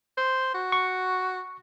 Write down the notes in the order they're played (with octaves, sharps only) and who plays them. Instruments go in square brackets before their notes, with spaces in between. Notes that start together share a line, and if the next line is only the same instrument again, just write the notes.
[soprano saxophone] C5
F#4
[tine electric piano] C#6